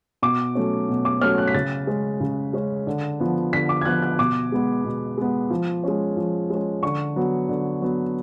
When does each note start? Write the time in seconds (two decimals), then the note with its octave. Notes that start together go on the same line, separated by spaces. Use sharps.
0.22 B2 D6
0.55 F#3 A3 C#4
0.89 B2
1.05 D6
1.21 F#3 A3 C#4 F6
1.38 F#6
1.48 B6
1.54 C#3 A6
1.87 G#3 C#4
2.21 C#3
2.53 G#3 C#4
2.87 D3
3.20 F3 B3
3.53 D3 B6
3.69 D6
3.81 G#6
3.85 F3 B3 F#6
4.02 F#6
4.19 B2 D6
4.52 G#3 B3
4.85 B2
5.18 G#3 B3
5.50 F3
5.84 G#3 C#4
6.17 F3
6.50 G#3 C#4
6.83 D3 C#6
7.16 F#3 B3
7.49 D3
7.82 F#3 B3